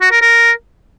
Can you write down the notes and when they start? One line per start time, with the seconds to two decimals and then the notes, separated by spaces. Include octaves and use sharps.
0.01 F#4
0.11 A#4
0.22 A#4